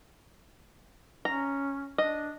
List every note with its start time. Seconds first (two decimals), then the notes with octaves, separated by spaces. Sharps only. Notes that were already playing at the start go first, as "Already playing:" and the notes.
1.25 C#4 A#5
1.98 D4 D#5